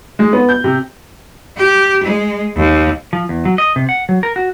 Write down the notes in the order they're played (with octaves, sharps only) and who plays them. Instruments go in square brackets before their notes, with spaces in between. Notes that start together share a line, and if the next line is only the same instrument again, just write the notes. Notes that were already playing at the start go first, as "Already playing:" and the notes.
[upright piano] G#3
B3
G6
C3
[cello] G4
G#3
D#2
[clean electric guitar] F3
E2
F#3
D#5
C3
F#5
F#3
A#4
F#4